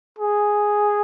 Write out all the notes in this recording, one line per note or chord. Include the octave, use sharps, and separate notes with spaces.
G#4